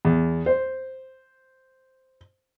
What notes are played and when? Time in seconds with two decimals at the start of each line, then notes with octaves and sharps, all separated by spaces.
0.05 E2
0.46 C5